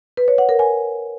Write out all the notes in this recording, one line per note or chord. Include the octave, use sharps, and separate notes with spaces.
B4
C#5
F#5
A#4
G#5